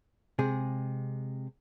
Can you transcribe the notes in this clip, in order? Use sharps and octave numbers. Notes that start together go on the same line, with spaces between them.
C3 G#3 G#4